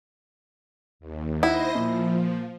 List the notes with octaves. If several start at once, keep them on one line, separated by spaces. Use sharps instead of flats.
D#2
D#4 E4 C5 D#5 F#5 A#6
A#2 F3